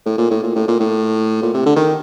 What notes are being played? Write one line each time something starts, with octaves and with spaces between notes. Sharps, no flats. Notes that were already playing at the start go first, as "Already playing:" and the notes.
A2
A#2
A2
A#2
A2
A#2
A2
A#2
C3
D3
D#3